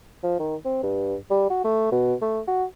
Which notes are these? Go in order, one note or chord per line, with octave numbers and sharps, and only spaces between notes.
F3
D#3
C4
G2
G3
F#4
A3
B2
A3
F#4